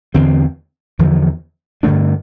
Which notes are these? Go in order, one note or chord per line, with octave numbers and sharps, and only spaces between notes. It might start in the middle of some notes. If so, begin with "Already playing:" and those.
E2 D3 A3 C4
E2 D3 F3
G2 D3 A3 D4